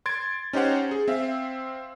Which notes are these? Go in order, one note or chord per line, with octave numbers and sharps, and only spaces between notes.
C6 G#6 A6 D7
C#4 D#4 G4 C5 F#5
G#4
C4 E5 F5